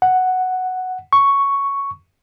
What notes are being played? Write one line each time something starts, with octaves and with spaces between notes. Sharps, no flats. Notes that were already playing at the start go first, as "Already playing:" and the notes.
F#5
C#6